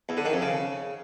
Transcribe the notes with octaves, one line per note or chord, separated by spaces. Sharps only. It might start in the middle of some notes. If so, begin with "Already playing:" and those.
E2
D3
D#3
F2
C#3